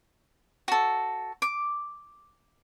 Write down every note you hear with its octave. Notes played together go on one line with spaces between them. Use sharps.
F#4 A4
D6